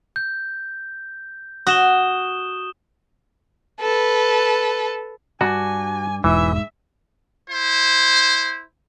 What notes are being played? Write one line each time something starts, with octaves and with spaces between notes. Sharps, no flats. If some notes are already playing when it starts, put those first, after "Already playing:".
G6
F#4 D#6 E7 G7
A4 B4
G2 D4 F#4 G#5
E1 G#2 E3 E5
E4 C5